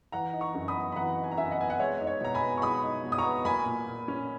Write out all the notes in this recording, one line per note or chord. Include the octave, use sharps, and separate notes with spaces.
E3 F#5 A#5
D#4
A#5 C#6
F#2
B5 D#6
B3
B5
E3 F#5 A#5
D#4
G#5
A#5
F#2 E5 G#5
D#5 F#5
B3 G#5
F#5
G#3 C#5 E5
D#4
C#5
B2 A#5
G#5 B5
B3
C#6
G#3 B5 D#6
D#4
B2
D#6
A#5 C#6
B3
A#3 G#5 B5
A#2
A#2
C#4